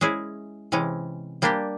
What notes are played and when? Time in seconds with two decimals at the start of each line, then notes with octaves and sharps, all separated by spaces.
0.01 G#3 C#4 E4 G#4
0.72 C3 E3 G#3 C#4
1.42 G3 A#3 D4 G4